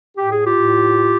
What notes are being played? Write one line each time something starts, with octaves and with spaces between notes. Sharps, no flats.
A2 G4
G#4
F4 G4
A2